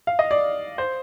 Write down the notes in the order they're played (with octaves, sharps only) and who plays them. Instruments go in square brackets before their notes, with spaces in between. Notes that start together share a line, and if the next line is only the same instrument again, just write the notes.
[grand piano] F5
D#5
D5
C5